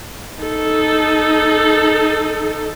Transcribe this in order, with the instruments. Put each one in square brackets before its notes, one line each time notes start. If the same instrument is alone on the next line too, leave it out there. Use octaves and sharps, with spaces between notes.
[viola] D#4 A4